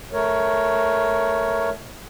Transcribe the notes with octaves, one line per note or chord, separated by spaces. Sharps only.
A3 A#4 C#5